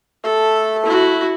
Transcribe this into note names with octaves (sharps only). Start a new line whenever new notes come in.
A3 A4
E4 F#4